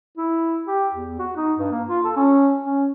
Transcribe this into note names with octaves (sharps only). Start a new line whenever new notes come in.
E4
G4
E2
F#4
D#4
G2
A#3
F4
A4
C#4
C#4